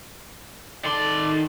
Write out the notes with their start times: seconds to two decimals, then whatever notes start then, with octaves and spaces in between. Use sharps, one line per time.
0.85 D#3 A4 D5 C6